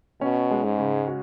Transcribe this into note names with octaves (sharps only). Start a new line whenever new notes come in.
B2 C#4
G#3
G#2
C#3
F#4